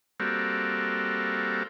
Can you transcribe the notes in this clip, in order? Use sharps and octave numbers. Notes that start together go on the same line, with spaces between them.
G3 A#3 C4 F#4 A4